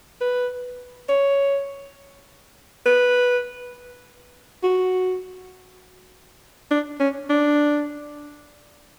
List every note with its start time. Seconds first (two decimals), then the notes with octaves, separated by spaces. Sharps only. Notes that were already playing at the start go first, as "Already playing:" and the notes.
0.21 B4
1.09 C#5
2.86 B4
4.63 F#4
6.71 D4
7.00 C#4
7.30 D4